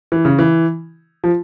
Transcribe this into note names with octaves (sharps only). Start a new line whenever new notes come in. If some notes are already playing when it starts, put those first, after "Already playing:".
E3
C#3
E3
F3